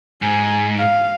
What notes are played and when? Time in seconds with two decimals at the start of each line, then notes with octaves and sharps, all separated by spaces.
0.22 G#2 G#5
0.79 F5